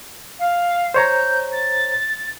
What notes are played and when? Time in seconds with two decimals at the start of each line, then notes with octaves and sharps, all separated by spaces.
0.39 F5
0.94 C5 C#5 A#5 G6
1.53 A6